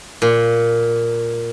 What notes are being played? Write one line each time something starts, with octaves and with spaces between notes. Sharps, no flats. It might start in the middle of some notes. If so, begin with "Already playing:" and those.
A#2